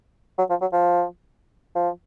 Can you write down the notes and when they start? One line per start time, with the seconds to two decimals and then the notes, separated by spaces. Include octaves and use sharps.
0.38 F#3
0.50 F3
0.61 F#3
0.73 F3
1.75 F3